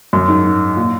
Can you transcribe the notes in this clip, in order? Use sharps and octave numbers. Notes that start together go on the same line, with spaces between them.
F#2
G#2
A#2